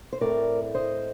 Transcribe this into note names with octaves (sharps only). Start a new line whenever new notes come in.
C5
A2 A3 C4 A#4 D5
C5 D#5